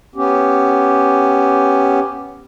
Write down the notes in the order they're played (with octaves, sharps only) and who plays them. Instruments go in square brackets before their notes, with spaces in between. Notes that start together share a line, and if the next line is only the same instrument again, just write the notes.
[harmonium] B3 C#4 G4